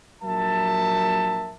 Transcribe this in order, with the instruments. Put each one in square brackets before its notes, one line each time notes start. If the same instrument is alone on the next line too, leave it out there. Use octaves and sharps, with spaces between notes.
[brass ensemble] A#1 F#3 A#4 E5 A5